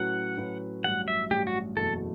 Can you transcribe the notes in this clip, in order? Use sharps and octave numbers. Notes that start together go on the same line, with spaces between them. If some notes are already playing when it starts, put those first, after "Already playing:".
Already playing: A2 F#3 C#4 F#4 B4 F#5
A2 F#3 C#4 F#4 B4
A1 G2 F#3 F#5
E5
A1 G2 F#3 G4
F#4
F#1 E2 B2 A3 A4